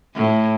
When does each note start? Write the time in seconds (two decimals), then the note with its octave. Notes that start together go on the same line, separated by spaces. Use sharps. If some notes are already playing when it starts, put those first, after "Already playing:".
0.16 A2